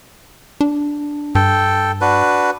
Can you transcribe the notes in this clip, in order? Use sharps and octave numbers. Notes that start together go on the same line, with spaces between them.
D4
G2 A4 G5
D4 F#4 B4